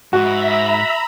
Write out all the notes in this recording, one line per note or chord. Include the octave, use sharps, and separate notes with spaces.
G#2 F#4 E5 A#5 B5